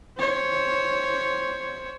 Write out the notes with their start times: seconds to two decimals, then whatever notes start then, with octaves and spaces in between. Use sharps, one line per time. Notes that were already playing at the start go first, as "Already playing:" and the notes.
0.18 C5 C#5